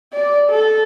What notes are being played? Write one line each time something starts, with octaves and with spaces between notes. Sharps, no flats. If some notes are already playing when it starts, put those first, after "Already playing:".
D5
A4